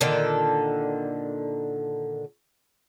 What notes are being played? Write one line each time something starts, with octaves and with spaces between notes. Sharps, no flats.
A#2 D3 D#3 A4